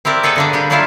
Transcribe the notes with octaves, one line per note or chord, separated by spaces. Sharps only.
C4 E4 G4 A#4 D5
B3 G#4 A4 B4 D#5
D3 A#3 D4
G3 D4 G4
F#3 G3 A#3 E4 F4 F5